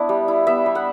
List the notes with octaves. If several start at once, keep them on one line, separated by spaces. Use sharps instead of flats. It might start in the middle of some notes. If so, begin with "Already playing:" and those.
Already playing: B3 D4 E4
G3
E4
B3 E5
G3
F#5